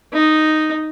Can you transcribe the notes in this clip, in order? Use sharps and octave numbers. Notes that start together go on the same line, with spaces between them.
D#4